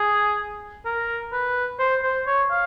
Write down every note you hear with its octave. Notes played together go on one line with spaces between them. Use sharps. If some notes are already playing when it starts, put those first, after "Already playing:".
Already playing: G#4
A#4
B4
C5
C5
C#5
F5